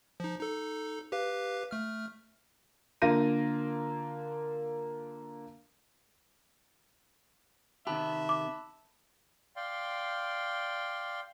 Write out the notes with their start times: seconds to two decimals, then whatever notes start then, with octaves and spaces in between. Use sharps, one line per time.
0.20 F3 D#4
0.39 D#4 A4
1.12 G4 B4 F5
1.71 A3 F6
3.02 D3 A#3 F4 A#6 D#7
7.87 C3 D#3 G4 E5 A5 B5 F#6
8.29 D6
9.56 D5 F5 G5 C6